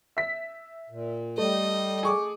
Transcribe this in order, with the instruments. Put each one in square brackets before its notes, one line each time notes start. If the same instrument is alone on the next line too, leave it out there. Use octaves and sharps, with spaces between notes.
[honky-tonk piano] E5 B6
[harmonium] A#2
[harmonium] G3 [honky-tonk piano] A3 [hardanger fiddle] D#5
[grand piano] G#4 C#6 D6